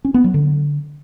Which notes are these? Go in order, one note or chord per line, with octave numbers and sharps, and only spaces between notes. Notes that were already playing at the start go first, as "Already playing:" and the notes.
C#4
B3
F#3
D3